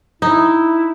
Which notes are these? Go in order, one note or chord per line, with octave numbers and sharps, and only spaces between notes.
D#4 E4